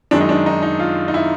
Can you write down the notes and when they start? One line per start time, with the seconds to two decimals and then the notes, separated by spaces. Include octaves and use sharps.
0.11 F#2 D#3 G#3 D4
0.21 D#4
0.29 D4
0.46 D#4
0.63 D#4
0.80 F4
1.08 D#4
1.14 E4